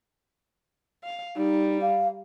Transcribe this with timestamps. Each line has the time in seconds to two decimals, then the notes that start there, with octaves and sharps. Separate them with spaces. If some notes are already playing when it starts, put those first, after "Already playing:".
1.04 F5
1.36 G3 D#4
1.81 F5